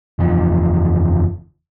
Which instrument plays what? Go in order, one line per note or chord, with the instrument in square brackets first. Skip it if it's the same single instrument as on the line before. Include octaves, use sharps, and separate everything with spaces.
[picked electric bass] F#1 E2 F3